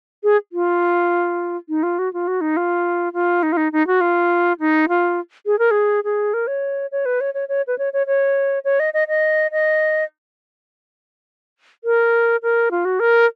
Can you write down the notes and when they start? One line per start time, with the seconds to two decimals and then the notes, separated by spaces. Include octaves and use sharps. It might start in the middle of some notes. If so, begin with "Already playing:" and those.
0.23 G#4
0.52 F4
1.69 D#4
1.83 F4
1.99 F#4
2.13 F4
2.28 F#4
2.41 D#4
2.57 F4
3.14 F4
3.43 D#4
3.52 F4
3.57 D#4
3.72 D#4
3.87 F#4
4.01 F4
4.60 D#4
4.89 F4
5.46 G#4
5.59 A#4
5.71 G#4
6.04 G#4
6.34 A#4
6.47 C#5
6.92 C#5
7.05 B4
7.21 C#5
7.34 C#5
7.49 C#5
7.67 B4
7.78 C#5
7.93 C#5
8.07 C#5
8.65 C#5
8.80 D#5
8.94 D#5
9.08 D#5
9.52 D#5
11.84 A#4
12.43 A#4
12.71 F4
12.85 F#4
13.00 A#4